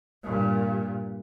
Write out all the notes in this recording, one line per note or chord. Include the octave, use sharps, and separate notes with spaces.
G2 A#2